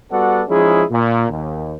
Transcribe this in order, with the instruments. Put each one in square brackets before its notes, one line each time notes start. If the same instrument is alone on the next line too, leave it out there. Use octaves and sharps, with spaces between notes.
[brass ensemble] G3 B3 F#4 A4 D5 F#5
F3 G#3 C#4 D#4 E4 G#4
A#2
D#2